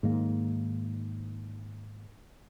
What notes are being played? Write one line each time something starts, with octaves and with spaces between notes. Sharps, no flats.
G#2 D#3 A#3